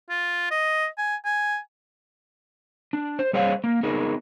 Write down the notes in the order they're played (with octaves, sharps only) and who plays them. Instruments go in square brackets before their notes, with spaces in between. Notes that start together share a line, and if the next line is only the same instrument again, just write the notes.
[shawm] F4
D#5
G#5
G#5
[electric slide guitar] D4
C5
G3 G#4 C5 C#5 F5
A#3
B3 D#4 G#4 A#4